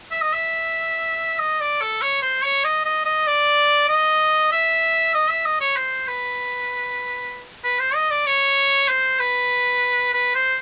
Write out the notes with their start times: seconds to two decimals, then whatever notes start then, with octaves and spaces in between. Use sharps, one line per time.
0.11 E5
0.22 D#5
0.33 E5
1.39 D#5
1.60 D5
1.81 A4
2.02 C#5
2.22 C5
2.44 C#5
2.64 D#5
2.85 D#5
3.05 D#5
3.27 D5
3.89 D#5
4.52 E5
5.14 D#5
5.30 E5
5.45 D#5
5.60 C#5
5.76 C5
6.08 B4
7.64 B4
7.79 C5
7.95 D#5
8.11 D5
8.26 C#5
8.89 C5
9.20 B4
10.14 B4
10.35 C5